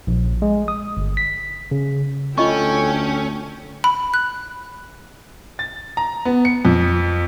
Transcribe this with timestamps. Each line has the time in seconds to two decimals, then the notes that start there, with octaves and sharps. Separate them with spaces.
0.07 A#1
0.42 G#3
0.68 D#6
0.97 G1
1.17 B6
1.71 C#3
2.38 D2 C#4 F4 A4 D#5 G5 C#6
3.84 B5
4.14 F#6
5.59 A6
5.97 A#5
6.25 B3
6.45 C#7
6.65 F2